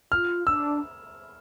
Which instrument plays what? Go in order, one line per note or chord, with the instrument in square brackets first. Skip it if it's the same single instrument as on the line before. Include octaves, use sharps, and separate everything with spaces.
[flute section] F4 [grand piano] F6
[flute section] D4 [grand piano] E6